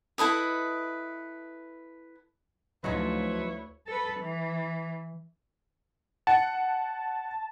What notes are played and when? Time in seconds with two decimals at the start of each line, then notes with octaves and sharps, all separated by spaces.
0.18 E4 A4 B4 D#5
2.84 D2 F3 F#3 C#4 D#4 E4 B4 C#5
3.87 A4 B4
4.20 E3
6.27 F#5 A5